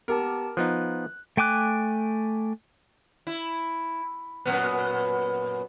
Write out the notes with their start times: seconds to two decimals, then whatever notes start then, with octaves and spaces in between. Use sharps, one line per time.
0.08 B3 G4 A#4 A5
0.57 F3 B3 D#4 F#6
1.37 A3 G5 G#5 D6 F#6
3.27 E4
4.46 F#2 A#2 B3